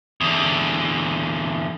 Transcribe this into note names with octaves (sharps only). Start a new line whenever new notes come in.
E2 D3